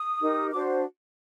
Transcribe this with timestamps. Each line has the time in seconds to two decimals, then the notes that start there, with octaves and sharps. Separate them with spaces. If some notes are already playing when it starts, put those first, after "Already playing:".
Already playing: D#6
0.20 D#4 G4 A#4
0.53 D4 F#4 C5 D6